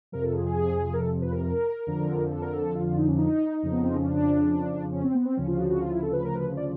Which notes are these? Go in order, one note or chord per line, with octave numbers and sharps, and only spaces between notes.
F2 C3 F3 A#4
A4
G#4
G#4
A#4
A4
B4
A#4
A#4
F2 D3 F3
A4
A#4
A4
F4
F4
D#4
C#4
D#4
F2 C#3 F3
B3
C4
C#4
D4
C#4
C4
B3
C4
D2 C#3 F3 C#4
F4
F#4
F#4
F4
E4
A4
B4
A#4
B4
D5